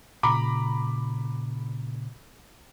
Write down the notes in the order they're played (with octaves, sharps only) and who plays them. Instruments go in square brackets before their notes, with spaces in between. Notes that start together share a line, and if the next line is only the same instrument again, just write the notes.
[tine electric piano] A#2 C#3 [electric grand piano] A#5 B5 D6